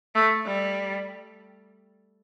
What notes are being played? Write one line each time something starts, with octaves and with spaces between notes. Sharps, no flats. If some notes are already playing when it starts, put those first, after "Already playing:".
A3
G3